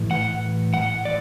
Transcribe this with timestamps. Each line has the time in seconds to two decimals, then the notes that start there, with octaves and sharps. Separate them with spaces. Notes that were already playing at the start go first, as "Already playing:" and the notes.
Already playing: A2 E3
0.11 F#5
0.74 F#5
1.05 D5